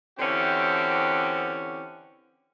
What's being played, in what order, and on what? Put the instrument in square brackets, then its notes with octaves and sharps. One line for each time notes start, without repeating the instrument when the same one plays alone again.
[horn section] D3 E3 C4 C#4 F#4 G4